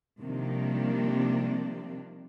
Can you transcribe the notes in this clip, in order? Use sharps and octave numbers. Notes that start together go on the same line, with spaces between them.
C3 D#3 F3 G3 A#3 D4